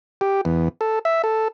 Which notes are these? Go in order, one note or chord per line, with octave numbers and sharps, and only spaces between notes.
G4
E2
A4
E5
A4